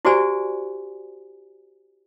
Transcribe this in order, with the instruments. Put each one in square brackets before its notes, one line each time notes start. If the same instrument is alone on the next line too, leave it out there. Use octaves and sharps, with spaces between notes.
[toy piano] E4 F#4 G4 C5 D5 G#5